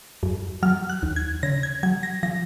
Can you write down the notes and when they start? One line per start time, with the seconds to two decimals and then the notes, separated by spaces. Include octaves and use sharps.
0.23 F#2
0.63 F#3 F6
0.90 F#6
1.03 D#2
1.16 G#6
1.43 C#3 A#6
1.63 G#6
1.83 F#3 G#6
2.03 A#6
2.23 F3 A#6